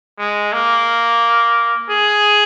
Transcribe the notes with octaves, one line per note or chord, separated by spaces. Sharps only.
G#3
A#3
G#4